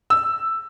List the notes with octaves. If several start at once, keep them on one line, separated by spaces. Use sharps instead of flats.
E6